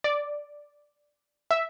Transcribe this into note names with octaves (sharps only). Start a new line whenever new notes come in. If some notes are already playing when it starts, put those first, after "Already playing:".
D5
E5